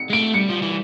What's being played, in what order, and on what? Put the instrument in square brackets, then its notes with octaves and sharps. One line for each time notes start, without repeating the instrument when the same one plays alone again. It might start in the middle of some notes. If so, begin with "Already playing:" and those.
Already playing: [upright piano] C#7
[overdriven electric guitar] G#3
[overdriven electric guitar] A3 [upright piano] D7
[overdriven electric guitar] G3 [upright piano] C#7
[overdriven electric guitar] F3
E3